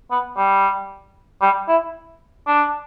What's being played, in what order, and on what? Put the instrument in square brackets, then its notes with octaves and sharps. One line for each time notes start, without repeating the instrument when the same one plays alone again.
[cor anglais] B3
G3
G3
E4
D4